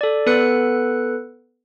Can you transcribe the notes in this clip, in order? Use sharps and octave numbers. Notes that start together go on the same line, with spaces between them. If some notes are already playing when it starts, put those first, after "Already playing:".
A4 D5
B3 A4 B4 F#6 C#7